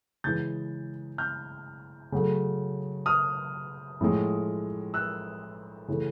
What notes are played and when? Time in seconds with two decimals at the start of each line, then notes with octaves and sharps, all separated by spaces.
0.24 C#3 E3 G#3 G6 A6
1.18 F6 G6
2.12 C#3 F#3 A3
3.06 D#6 F6
4.01 A2 F3 G#3
4.94 E6 F#6
5.88 C#3 E3 A3